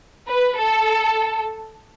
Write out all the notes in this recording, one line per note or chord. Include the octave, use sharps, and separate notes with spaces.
B4
A4